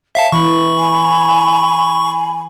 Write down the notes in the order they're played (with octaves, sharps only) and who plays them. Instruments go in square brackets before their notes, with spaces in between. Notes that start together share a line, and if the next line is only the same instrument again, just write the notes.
[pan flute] C#5 [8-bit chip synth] E5 F5 A5
[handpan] E3 [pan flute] B5 [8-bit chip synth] C#6
[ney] G#5